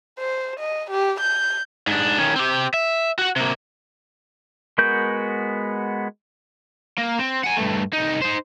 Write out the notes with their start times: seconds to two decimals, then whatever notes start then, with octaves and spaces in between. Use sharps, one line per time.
0.19 C5
0.59 D#5
0.91 G4
1.20 G6
1.87 G#2 D4
2.19 D#3 C#4
2.36 C4 G4
2.74 E5
3.19 F#4 F#5
3.36 C3 A#3
4.78 G#3 B3 F#4 A#4 G6
6.98 A#3
7.19 C4
7.43 F#5 G#5
7.57 G2 A3
7.93 C2 D#4
8.22 D#4 C5